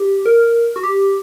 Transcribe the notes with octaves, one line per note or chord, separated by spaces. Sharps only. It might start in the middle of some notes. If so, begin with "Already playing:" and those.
Already playing: G4
A#4
F#4
G4